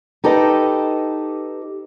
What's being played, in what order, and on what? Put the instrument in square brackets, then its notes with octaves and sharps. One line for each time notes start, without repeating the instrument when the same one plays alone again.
[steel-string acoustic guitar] D#4 G4 A4 B4 D#5